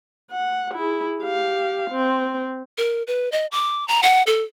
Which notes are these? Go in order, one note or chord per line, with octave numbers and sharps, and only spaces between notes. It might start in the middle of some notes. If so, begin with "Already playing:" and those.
F#5
E4 G#4
G4 F5
C4
A#4
B4
D#5
D6
A#5
F#5
A4